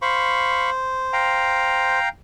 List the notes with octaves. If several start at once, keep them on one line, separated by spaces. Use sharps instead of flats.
C5 F5 B5 C#6
F5 G5 A#5